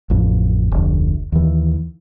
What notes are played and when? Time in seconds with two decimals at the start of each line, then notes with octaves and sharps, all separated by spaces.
0.10 A1 F2
0.72 F1 D2
1.32 D#2 E3